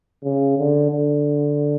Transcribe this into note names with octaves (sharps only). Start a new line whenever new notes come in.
C#3
D3
D3